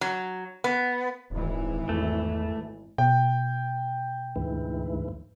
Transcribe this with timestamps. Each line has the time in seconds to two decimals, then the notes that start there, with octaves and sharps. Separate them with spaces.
0.01 F#3
0.64 B3
1.30 D#1 G#1 E3
1.89 E2 A3
2.98 B2 G5
4.36 D2 G#2 E3